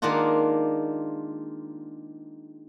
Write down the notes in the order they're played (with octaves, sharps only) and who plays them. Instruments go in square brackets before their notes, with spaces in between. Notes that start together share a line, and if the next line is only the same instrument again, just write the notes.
[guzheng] D#3 G#3 A#3 D4 F4 F#5